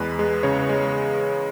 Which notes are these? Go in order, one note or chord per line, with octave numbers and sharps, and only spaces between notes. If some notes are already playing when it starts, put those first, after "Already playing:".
Already playing: E2 G#3 B4
G#3
C#3 C#5
G#3